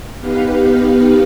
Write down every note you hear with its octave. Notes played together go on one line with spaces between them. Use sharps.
B3 D#4 G4 B4 F5